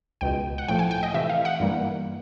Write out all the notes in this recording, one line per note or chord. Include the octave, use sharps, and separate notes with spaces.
C#2 B2 G#3 G5
F#5
A2 F3 A3 G5
G#5
G5
D#5
C3 E3 A3 E5
F5
F#5
G2 E3 G3 A#3